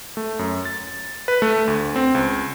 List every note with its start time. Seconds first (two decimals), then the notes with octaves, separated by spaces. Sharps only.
0.17 A3
0.39 F#2
0.65 A6
1.28 B4
1.42 A3
1.67 D2
1.96 C4
2.15 C#2